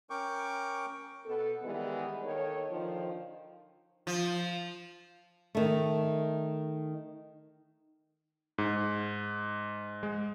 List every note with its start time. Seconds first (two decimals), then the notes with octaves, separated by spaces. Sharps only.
0.10 C#4 A#4 G5 C#6 D6
1.25 B2 B3 A4
1.62 D#3 E3 G3 G#3 B3
2.22 D#2 D#3 A4 C#5
2.69 D3 D#3 F3
4.07 F3
5.55 D#3 A3
8.58 G#2
10.03 G#3